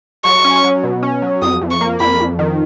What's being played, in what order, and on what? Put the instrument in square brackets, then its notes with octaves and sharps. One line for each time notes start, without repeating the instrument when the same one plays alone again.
[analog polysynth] F#3 [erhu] C#6
[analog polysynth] C#4
F#3
B2
C#4
F#3
[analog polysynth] F2 [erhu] D#6
[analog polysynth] F2
[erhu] C#6
[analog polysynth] A#3
[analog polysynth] F2 [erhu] B5
[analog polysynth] F2
D#3